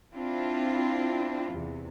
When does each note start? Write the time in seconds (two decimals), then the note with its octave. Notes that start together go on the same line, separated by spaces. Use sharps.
0.14 C4 D4 E4 F4
1.53 E2 C3